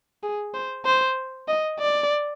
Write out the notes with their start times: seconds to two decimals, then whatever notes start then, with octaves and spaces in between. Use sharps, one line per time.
0.23 G#4
0.54 C5
0.85 C5
1.48 D#5
1.79 D5